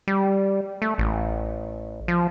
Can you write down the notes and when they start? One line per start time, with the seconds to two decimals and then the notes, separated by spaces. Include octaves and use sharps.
0.08 G3
0.82 A3
0.98 A1
2.08 F3